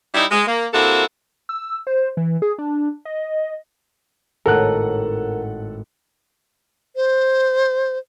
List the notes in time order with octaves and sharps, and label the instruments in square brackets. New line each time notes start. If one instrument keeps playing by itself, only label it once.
[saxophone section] G3 D#4 E4
G#3
A#3
C3 A#3 E4 F#4 A4
[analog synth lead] E6
C5
E3
G#4
D4
D#5
[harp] G#1 A2 D#7 [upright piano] A4 F#5 F#6 [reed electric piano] A#4
[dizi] C5